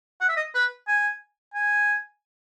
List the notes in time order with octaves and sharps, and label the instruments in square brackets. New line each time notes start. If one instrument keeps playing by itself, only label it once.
[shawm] F#5
E5
D#5
B4
G#5
G#5